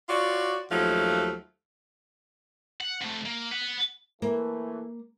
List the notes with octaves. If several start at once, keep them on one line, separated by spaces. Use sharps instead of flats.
F4 F#4 C#5 D5
D#2 F3 F#3 A3 D#4 F5
F#5
C3 A3
A#3
B4 F#5
E3 A3 A#3